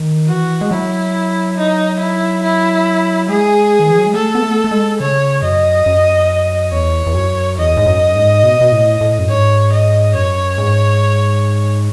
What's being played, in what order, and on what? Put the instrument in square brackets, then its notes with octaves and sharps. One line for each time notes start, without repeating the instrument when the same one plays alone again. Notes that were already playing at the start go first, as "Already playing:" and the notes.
Already playing: [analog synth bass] D#3
[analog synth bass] E3 [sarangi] F#4
[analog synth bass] G#3
[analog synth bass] F#3 [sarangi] E4
[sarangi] D#4
E4
E4
[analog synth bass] G#3 [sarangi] G#4
[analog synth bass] D#3
E3
F#3
G#3
[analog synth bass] A3 [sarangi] A4
[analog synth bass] B3
A3
A3
G#3
[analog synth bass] C#3 [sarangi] C#5
[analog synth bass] F#2 [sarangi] D#5
[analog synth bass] F#2
[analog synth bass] E2 [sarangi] C#5
[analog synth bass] E2
F#2
[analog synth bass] E2 [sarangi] D#5
[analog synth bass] G#2
F#2
G#2
B2
B2
A2
A2
F#2
[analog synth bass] G#2 [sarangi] C#5
[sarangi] D#5
[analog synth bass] F#2 [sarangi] C#5
[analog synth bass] G#2